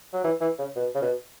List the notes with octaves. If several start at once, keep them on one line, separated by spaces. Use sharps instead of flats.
F#3
E3
E3
C#3
B2
C#3
B2